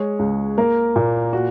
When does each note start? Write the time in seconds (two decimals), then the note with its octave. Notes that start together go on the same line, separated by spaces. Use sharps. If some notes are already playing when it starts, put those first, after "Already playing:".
Already playing: G#3 C#5
0.19 C#2
0.58 A#3 A#4
0.96 A#2
1.33 F#4